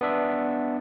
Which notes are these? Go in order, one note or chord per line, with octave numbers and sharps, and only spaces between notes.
B3 D4 E5